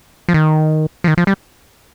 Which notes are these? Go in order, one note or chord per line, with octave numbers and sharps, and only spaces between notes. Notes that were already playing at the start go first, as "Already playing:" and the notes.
F3
D#3
F3
D#3
F3
G3